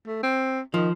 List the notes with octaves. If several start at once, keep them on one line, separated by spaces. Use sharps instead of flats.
A3
C4
D#3 F3